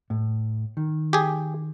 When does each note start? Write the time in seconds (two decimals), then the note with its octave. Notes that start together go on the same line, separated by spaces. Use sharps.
0.10 A2
0.77 D#3
1.13 G4 G#4